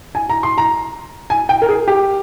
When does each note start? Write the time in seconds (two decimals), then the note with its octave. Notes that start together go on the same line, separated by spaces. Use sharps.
0.15 G#5
0.29 A#5
0.43 C6
0.58 A#5
1.30 G#5
1.49 G5
1.62 A#4
1.69 G#4
1.88 G4